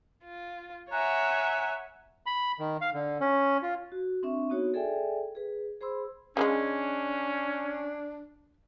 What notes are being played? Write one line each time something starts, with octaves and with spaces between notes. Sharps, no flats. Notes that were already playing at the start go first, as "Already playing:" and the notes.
F4
C#5 E5 F#5 G#5 A#5 F#6
B5
D#3
F5
D3
C#4
F4
F#4
C4 D4 E5 C#6
B3 D#4 F#4 C#5
G#4 A4 D5 E5 G5 G#5
G#4 B4
G#4 C5 B5 C6 E6
C#3 F#3 G#3 C#4 D4